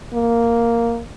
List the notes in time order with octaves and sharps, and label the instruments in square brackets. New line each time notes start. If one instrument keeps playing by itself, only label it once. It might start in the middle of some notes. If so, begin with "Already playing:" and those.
[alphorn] A#3